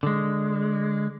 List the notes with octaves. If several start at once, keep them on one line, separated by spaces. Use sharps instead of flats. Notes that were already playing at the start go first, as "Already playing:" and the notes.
D3 G#3